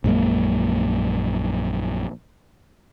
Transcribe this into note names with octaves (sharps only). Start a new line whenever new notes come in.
A#1 F#2 G#3 A#3